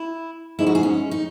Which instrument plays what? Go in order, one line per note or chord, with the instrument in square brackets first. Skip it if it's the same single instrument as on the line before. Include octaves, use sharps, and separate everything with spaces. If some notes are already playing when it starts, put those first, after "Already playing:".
Already playing: [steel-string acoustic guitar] E4
[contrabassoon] G#2 [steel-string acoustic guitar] E4
[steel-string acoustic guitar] F#4
G#4
C#4
D#4